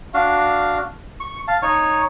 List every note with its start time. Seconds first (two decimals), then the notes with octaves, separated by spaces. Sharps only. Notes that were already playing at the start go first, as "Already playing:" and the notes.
0.14 D4 F#4 F5
1.20 C#6
1.48 F5 A5
1.62 D#4 C#5 C#6